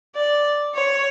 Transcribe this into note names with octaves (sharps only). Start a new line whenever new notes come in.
D5
C#5